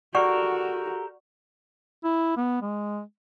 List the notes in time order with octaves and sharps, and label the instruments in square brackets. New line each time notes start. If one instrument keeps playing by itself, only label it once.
[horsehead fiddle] F#4 [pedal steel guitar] G4 A4 A#4 [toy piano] D5 F#5 C#6
[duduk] E4
B3
G#3